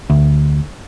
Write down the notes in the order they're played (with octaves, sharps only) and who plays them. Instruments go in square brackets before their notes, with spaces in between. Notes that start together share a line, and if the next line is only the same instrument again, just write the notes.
[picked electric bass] D2